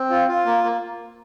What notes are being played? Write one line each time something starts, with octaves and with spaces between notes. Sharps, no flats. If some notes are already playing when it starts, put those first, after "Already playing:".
Already playing: C4
F4
F4
A#3
A#3